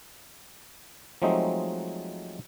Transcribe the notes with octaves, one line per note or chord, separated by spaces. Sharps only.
F3 F#3 G#3 A3 C4 D#4